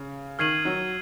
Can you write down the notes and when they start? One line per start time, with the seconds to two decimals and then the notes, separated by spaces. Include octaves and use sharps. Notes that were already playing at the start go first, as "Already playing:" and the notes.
Already playing: C#3
0.39 D#3 F6 G#6 C7 D#7 F#7
0.65 F#3